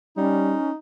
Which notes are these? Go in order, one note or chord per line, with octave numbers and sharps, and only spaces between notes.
G3 C#4 D#4